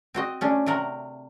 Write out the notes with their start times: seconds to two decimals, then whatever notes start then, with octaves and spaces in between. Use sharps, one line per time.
0.14 C4 F#4 D#5
0.41 A3 C#4 D4
0.66 C3 A3 A#4 F#5